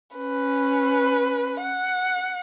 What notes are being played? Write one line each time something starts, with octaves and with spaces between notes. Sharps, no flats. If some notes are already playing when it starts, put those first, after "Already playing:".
C#4 B4
F#5